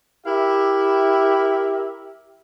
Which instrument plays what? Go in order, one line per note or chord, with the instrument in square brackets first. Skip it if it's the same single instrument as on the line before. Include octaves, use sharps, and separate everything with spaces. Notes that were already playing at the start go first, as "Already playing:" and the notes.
[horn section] E4 G4 A#4 E5